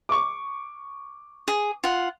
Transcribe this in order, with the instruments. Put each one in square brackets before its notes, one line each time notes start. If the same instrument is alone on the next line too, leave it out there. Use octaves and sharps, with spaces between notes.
[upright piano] C#6 D6
[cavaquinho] G#4
F4 F#5